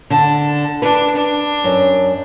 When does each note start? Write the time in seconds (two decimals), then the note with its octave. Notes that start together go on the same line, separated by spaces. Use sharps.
0.10 D3 A5
0.82 D4 B4
1.16 D4
1.64 F#2